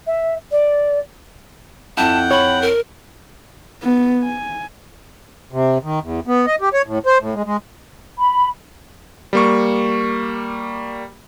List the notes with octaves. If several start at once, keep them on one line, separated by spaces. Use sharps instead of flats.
E5
D5
F2 E4 F#5 G5 A5
C#5 B5
A#4
B3
G#5
C3
D#3
E2
B3
D#5
G4
C#5
A2
C5
A2
G#3
G#3
B5
G3 A#3 C#6